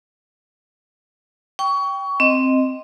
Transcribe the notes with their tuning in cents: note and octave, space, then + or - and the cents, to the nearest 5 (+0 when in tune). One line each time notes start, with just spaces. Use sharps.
G5 +0 C#6 +20
C4 +0 D#5 +0